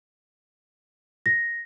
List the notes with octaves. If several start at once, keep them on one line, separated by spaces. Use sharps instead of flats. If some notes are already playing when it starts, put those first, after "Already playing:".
A#6